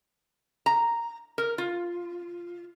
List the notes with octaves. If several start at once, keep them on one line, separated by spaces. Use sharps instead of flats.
A#5
A#4
F4